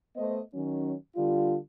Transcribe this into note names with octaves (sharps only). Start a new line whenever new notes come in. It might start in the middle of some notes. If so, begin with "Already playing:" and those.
A3 B3 C5 D#5
D#3 F#3 C#4
D3 G3 F4